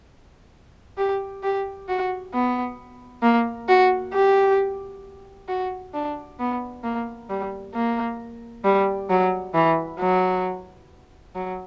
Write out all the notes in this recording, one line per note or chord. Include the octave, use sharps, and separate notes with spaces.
G4
G4
F#4
B3
A#3
F#4
G4
F#4
D4
B3
A#3
G3
A#3
G3
F#3
E3
F#3
F#3